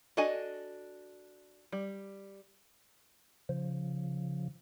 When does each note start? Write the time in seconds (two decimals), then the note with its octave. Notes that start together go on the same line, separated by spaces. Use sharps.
0.17 D4 F#4 A4 D#5 G#5
1.72 G3
3.49 C#3 F3